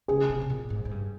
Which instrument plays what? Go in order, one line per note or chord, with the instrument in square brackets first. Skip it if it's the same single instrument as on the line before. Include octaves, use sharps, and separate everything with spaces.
[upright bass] C#3 [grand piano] G#4
[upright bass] C3
C3
A#2
G#2
G#2
G2